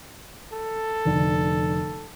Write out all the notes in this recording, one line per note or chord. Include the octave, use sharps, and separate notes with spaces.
A4
F1 D3